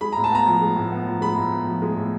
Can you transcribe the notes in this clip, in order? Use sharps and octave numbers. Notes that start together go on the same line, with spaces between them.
G#3 B5
A2 A#5
A5
B3 A#5
F3
G#3
A2
B3
F3
G#3 B5
A2
B3
F3
G#3
A2